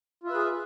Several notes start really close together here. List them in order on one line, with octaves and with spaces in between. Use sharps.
F4 E5 B4 G#4